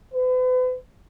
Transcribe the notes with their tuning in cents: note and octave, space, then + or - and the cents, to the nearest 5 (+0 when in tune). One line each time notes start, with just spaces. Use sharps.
B4 +40